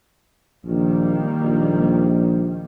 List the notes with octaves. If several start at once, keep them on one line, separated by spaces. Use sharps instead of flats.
A#1 D#3 G3 A#3
A#1